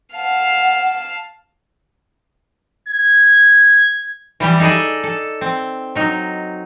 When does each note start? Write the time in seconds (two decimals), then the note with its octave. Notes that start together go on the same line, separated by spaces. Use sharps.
0.15 F5 F#5 A5
2.88 G#6
4.40 E3 G3 G4
4.60 D#4 G#4 A4 D5 D#5
5.03 A4
5.41 C4
5.95 F#3 D#4